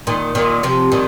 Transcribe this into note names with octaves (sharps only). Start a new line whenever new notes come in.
A#2 D#3
A#2 D#3
C3 F3
A#2 D#3